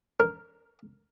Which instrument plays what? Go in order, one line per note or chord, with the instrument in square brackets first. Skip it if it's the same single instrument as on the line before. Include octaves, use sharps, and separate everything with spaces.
[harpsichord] A#4